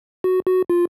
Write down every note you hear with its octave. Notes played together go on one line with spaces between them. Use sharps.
F#4
F#4
F4